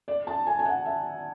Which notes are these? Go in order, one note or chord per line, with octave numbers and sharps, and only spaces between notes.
D5
A5
G#5
G#5
F#5
E5